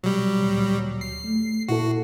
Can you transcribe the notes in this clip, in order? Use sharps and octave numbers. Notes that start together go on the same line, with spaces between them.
B2 F#3 G3
D2 A#2
C7
A3
A#2 E4 F#4 A4